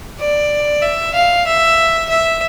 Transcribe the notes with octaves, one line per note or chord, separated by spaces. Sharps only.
D5
E5
F5
E5
E5